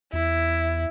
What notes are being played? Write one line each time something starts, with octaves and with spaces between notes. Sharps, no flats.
E2 E4